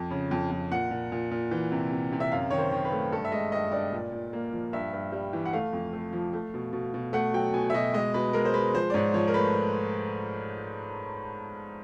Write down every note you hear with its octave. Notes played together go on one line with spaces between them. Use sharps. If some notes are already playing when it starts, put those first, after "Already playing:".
Already playing: F2
C#3
F2
F2
A#2 F#5
A#2
A#2
A#2
E3
C3
C3
C3
E5
F#2 F5
D#3 C#5
C5
D#3
B4
A3
G2 A4
E5
G#3 D#5
G2 D#5
G2 D5
A#2
A#2
A#3
F3
G2 E5
G2
G3
E3
F#5
A3 F5
F2
A3
F3
A3
B2
B2
B2
A3 F#5
F#3 G5
B2 G#5
E5
B2 D#5
G#3 D#5
B2 B4
G#3 A#4
C5
G#3 B4
F3 C5
D5
G#2 C#5
F3 C#5
A#4
A3 B4